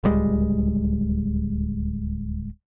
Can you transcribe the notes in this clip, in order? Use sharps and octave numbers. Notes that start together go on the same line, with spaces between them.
D1 C#2 G3 G#3